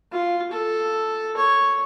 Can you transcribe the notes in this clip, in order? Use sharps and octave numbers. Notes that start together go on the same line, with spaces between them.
F4
A4
C#5